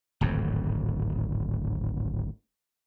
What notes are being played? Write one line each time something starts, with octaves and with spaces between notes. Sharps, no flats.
D1 G#1 F2